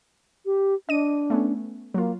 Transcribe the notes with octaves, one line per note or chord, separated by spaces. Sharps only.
G4
D4 D#5 D#7
A3 B3 C#4
F#3 A#3 F4